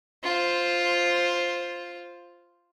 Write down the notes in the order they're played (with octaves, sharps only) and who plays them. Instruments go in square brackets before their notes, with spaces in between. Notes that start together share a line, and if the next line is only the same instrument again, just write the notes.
[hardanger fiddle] F4 C5